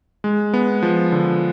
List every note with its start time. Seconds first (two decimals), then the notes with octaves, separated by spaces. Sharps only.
0.24 G#3
0.54 B3
0.83 F3
1.12 D3